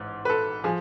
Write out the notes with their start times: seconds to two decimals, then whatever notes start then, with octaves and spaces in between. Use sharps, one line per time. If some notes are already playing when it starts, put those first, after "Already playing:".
Already playing: A1 G#2
0.25 B4
0.30 A4
0.64 F3 G#4